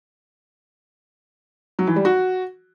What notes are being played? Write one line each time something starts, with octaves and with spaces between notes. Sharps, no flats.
F#3
E3
G3
F#4